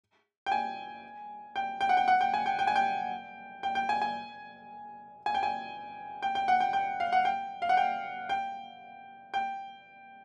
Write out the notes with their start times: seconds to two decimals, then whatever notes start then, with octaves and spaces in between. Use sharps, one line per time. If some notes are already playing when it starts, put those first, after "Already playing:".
0.46 G5
0.52 G#5
1.56 G5
1.81 G5
1.89 F#5
1.97 G5
2.08 F#5
2.21 G5
2.34 G#5
2.46 G5
2.59 G5
2.67 G#5
2.76 G5
3.63 G5
3.75 G5
3.89 G#5
4.02 G#5
5.26 G#5
5.34 G5
5.43 G#5
6.22 G5
6.35 G5
6.48 F#5
6.60 G5
6.73 G5
7.00 F5
7.13 F#5
7.25 G5
7.62 F5
7.69 F#5
7.77 G5
8.29 G5
9.34 G5